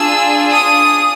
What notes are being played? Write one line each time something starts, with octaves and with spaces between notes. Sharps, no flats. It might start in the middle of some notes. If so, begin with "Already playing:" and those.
Already playing: D4 F4 G#4 E6
D#6